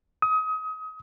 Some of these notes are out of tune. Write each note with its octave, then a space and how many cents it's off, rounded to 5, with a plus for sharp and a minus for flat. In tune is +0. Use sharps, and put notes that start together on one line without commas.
D#6 +30